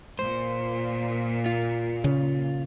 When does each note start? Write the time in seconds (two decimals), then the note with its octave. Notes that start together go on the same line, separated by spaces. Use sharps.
0.19 A#2 C5
1.46 F4
2.04 C#3